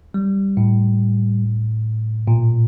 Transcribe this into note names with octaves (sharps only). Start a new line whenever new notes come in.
G3
A2
A#2